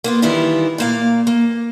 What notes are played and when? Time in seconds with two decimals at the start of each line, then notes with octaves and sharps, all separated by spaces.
0.04 A#3 B3 F4
0.22 D#3 E3 G3 E4 F4
0.78 A#2 A#3 F5
1.27 A#3